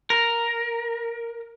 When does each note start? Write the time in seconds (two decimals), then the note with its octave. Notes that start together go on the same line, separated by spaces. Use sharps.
0.10 A#4